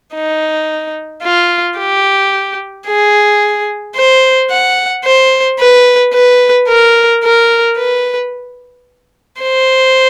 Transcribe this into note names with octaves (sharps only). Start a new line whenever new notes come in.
D#4
F4
G4
G#4
C5
F#5
C5
B4
B4
A#4
A#4
B4
C5